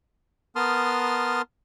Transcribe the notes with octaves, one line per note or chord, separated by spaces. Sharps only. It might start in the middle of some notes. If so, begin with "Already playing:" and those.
B3 A#4 A5 C6 D#6 F6